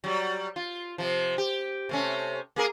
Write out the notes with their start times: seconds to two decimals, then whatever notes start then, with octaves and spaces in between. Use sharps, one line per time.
0.04 F#3 G3
0.56 F4
0.98 C3 F3
1.38 G4
1.89 C3 A3 C#4
2.56 A#3 G#4 A#4